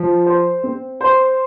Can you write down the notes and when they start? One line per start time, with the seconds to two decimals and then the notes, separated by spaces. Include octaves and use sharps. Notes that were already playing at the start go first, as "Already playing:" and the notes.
Already playing: F3
0.26 C5
0.63 C4
1.01 C5